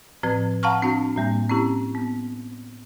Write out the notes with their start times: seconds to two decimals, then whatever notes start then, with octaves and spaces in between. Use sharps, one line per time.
0.23 A2 F3 C4 B4 G#6
0.63 F5 F#5 A5 A#5 C#6 F6
0.83 C4 D4 F#4
1.16 A2 G3 A#3
1.49 C4 C#4 E4 G4
1.95 B3